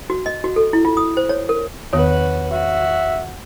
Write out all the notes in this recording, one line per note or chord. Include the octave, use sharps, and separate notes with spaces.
F#4
D#5
F#4
A4
E4
F4
D#6
C5
C#5
A#4
E2 D#3 B3 F#4 B4 C#5
F#4 E5